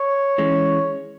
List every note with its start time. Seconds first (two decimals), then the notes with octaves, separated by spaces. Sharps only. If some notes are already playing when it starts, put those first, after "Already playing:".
Already playing: C#5
0.38 E3 G#3 C#4